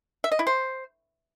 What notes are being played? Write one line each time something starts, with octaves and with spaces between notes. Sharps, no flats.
E5
D#5
E4
C5